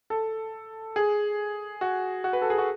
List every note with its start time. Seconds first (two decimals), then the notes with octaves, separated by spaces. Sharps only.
0.10 A4
0.96 G#4
1.81 F#4
2.24 F#4
2.33 B4
2.42 A4
2.50 G#4
2.58 F#4